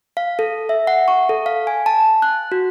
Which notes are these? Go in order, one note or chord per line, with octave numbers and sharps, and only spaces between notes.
F5
A4
E5
F#5
C#6
A4
F5
G#5
A5
F#6
F#4